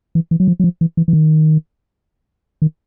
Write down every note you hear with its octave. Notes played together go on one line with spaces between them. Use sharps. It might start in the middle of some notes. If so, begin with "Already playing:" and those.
E3
E3
F#3
F3
F#3
F3
E3
E3
E3
D#3
D#3